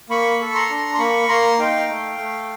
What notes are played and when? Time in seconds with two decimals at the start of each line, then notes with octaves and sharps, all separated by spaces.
0.10 A#3 B5 C#6
0.40 A4
0.54 A#5 C6
0.70 D4
0.94 C6
0.99 A#3 B5 C#6
1.28 A#3 A#5 C6
1.59 D#4 F5 G5
1.88 A3
2.18 A3